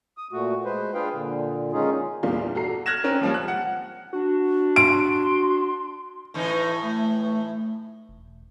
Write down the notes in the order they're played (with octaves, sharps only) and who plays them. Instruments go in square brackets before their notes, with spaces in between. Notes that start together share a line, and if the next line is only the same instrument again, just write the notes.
[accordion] D#6
A#2 A3 F#4
G#3 B4 C5
D4 F4 G#4 B4 F5 G5
A#2 D3
D#3 G#3 C#4 D#4 F4 G#4
[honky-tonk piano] G1 E2 A#2 G3 F4
F#4 A4 A#5 C7
[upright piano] F6 F#6 G#6 A#6 E7
C4 C#4 A#4
D#2 F3 G3
F#6
F#5
[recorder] D4 [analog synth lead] F#4
[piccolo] C6 [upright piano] D7
[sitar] A2 E3 D#4
[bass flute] A3
[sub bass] E1